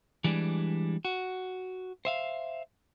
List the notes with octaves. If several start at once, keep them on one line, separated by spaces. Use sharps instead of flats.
E3 G3 G#3 D4
F#4
C5 E5 F5